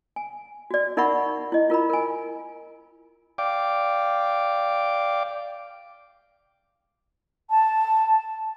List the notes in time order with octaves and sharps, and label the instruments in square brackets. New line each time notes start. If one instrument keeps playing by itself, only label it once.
[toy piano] G#5
F#4 D5
D#4 A#4 E5 F#5 B5 C#6
E4 D#5
F4 A#4 A#5 B5
A#4 G#5
[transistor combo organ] D5 F5 G5 D6
[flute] A5